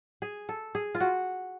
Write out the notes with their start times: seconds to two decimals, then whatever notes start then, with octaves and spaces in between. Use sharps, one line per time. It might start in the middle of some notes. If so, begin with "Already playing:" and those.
0.22 G#4
0.49 A4
0.75 G#4
0.95 F4
1.00 F#4